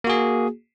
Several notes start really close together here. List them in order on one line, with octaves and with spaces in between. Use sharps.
A#3 F#4 G#4